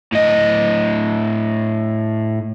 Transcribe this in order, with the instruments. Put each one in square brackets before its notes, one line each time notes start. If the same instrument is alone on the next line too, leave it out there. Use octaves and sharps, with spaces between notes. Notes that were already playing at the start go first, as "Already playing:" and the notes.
[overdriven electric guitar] A2 D#5